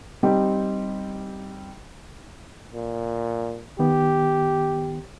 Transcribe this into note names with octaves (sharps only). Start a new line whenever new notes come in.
G3 C4 D#4 G4
A#2
D#3 B3 G4